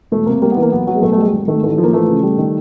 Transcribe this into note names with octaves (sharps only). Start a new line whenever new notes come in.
E1 A3
C3 A#3
G3 A#3
B3
E3
A#3
B1 B3
F#3 B3
G#3
B1 A3
A3
G3 G#3
G#1
D#3 A3
A1 A3
F3
A#3
E3 A3
C#3
G3
D#3